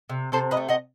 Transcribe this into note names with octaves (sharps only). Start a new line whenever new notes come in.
C3
C3 A4 C5
B4 D#5
A3
D#5 F#5